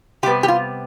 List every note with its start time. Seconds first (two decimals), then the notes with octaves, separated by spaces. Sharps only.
0.23 C3 G4
0.26 G3 B3
0.43 G4
0.48 F4